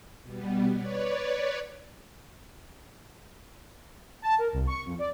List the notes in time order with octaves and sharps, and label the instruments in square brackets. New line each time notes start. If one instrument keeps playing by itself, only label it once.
[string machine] B2 G3 B3
B4 C#5 D5
[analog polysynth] A5
A#4
C2
C#6
F2
D5